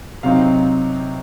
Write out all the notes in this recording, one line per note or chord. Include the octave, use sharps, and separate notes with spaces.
C3 F#3 C4 D#4 F5